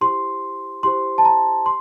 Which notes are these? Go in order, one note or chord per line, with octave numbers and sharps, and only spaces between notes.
E4 G4 C5 C6
E4 G4 C5 C6
A5
A#5
C6